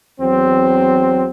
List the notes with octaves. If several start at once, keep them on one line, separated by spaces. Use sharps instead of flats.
E2 F#3 C4